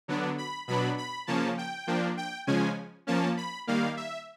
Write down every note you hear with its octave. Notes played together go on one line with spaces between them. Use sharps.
D3 F#3 B3 D4
B5
B2 F#3 B3 D4 B5
B5
C#3 F3 A#3 C#4 A5
G5
F3 A#3 D4
G5
C#3 F3 G#3 C#4 G#5
F3 A#3 C#4 A5
B5
D#3 G3 A#3 F5
E5